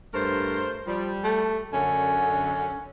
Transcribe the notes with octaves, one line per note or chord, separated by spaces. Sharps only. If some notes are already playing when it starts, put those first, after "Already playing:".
G2 A3 A#4 C5
F3 G3
A3
F#2 D3 C#4